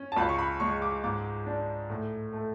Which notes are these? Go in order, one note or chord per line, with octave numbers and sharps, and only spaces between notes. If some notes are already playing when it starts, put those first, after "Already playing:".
Already playing: C#4
A5
C#2 B5
C#6
B5
G#3 C#6
D6
G#2 D6
D4
A2
A3